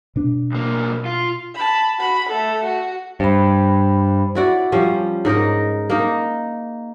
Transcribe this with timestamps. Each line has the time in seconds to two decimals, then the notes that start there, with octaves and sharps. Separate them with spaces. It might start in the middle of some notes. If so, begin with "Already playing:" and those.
0.16 B2 D4
0.52 B1 A#3
1.06 F4
1.55 A5 B5
2.00 F#4 B5
2.29 A3 A4
2.64 F#4
3.20 G2 C5 B5
4.35 E4 F#4 D5
4.72 F3 G3 C#4
5.25 G#2 D#4 A#4 D#5
5.90 A#3 D#4